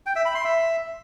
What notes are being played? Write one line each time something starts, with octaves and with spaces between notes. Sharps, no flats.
G5
E5
B5
C6
E5